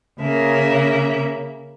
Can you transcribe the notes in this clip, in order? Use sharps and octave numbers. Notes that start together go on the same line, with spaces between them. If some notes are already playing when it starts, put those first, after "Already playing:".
C#3 A#3 E5